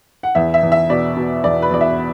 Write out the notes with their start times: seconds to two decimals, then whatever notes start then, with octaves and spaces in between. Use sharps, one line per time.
0.23 F#5
0.35 E2 E5
0.54 E5
0.63 E2
0.72 E5
0.89 B2 D5
1.16 B2
1.44 E2 D5
1.62 B4
1.71 E2 D5
1.81 E5